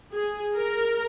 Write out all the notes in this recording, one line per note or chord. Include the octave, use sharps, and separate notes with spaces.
G#4
A#4